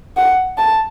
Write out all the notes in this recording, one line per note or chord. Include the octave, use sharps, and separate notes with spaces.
F#5
A5